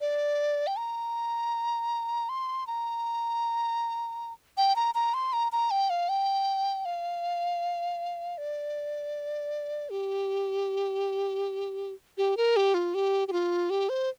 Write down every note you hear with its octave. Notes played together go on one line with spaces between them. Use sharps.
D5
G5
A#5
C6
A#5
G5
A#5
A#5
C6
A#5
A#5
G5
F5
G5
F5
D5
G4
G4
A#4
G4
F4
G4
G4
F4
G4
C5